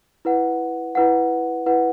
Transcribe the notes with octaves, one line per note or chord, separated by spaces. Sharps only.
E4 B4 F#5
E4 B4 F#5
E4 B4 F#5